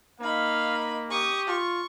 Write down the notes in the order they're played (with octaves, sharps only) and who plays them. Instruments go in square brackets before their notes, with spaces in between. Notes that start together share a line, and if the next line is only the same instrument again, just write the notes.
[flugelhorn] A#3 [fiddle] D#4 B5 [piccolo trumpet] F5
[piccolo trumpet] G4 [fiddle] C#6 D#6
[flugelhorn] F4 [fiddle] C#6